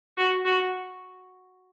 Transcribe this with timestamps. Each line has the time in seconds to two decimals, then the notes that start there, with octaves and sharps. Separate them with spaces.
0.17 F#4
0.45 F#4